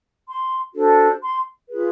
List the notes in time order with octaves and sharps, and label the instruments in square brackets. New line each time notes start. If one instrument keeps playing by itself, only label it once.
[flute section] C6
D4 F#4 A4 C5
C6
F4 G#4 B4